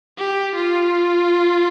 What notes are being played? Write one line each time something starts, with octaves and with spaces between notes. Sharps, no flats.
G4
F4